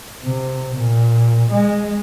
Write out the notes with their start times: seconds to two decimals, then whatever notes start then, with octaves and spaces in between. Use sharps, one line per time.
0.24 C3
0.76 A#2
1.52 G#3